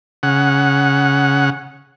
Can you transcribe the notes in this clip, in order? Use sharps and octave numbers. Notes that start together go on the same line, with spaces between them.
C#3 F#5